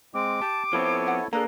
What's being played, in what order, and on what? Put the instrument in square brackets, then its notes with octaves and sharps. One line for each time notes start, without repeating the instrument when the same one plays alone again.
[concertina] G#3 C4 [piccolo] D6
[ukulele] G4 [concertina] A5
[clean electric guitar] F3 B3 C4 [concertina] E4 A4 C#5
[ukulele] E5 F#5
[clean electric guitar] A#3 [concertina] D4 A4 [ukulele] G#4 B4 A#5